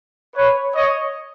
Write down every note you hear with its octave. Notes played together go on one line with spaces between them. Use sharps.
B4 C#5
C#5 D#5